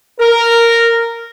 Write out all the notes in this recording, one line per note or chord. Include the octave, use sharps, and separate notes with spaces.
A#4